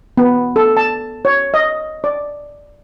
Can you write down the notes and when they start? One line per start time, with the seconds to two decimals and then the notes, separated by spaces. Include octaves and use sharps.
0.17 B3
0.56 A4
0.77 A5
1.25 C#5
1.54 D#5
2.04 D5